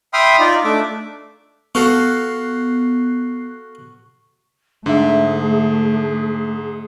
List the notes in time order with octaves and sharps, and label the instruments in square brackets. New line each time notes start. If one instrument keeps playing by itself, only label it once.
[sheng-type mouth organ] E5 G5 B5 C6 D#6 F6
D#4 F4 D5
A3 D4 E5 D6
[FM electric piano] B3 F#6 C7 [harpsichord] F#4 A4 F5 [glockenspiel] C#6
[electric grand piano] G#2 [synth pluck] D3 E5 [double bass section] A3 [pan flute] G#4